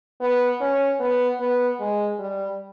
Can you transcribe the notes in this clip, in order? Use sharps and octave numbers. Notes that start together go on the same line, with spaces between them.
B3
C#4
B3
B3
G#3
G3